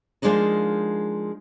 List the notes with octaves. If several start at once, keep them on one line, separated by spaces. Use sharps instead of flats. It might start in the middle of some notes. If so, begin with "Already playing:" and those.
F3 G#3 A#3 D4 D#4